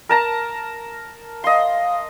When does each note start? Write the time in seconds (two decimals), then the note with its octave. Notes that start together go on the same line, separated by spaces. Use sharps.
0.09 A#4 A5 A#5
1.44 D#5 F5 C6